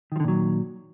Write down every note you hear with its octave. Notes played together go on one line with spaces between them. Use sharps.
A#2 D3 D#3 F3 F#3